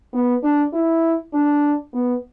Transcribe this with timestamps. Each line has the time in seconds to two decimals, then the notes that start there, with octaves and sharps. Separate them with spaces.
0.13 B3
0.43 D4
0.73 E4
1.33 D4
1.93 B3